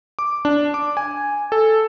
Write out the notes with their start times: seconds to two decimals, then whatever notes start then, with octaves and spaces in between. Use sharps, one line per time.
0.19 D6
0.45 D4
0.74 D6
0.97 G#5
1.52 A4